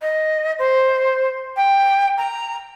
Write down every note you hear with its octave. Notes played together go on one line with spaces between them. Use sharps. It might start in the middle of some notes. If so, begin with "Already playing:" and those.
D#5
C5
G5
A#5